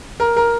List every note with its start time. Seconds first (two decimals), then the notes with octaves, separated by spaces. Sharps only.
0.20 A#4
0.37 A#4